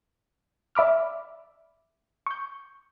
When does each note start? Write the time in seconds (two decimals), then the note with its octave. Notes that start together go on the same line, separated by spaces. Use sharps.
0.75 D5 E5 B5 D6 F6
2.27 C#6 G6